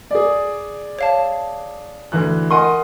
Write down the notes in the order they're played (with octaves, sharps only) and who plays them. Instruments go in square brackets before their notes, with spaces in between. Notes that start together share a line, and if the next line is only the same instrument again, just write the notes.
[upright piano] G#4 D5
[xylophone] C#5 F5 A5
[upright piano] D2 E3 F#6
[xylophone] A#4 G#5 [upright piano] D#5 F#5 C6